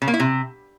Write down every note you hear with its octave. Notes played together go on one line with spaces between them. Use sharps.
C#3
A#3
E4
C3